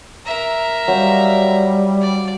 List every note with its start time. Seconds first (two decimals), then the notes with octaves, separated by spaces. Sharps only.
0.26 A#4 E5
0.88 F#3 G3 C5 F5
2.01 D5